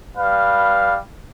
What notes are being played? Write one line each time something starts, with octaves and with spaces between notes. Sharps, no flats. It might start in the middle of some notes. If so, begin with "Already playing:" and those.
G3 B4 F5